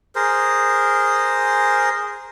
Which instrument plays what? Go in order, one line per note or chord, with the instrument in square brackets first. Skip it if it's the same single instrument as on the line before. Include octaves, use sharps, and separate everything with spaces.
[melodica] G#4 A#4 C5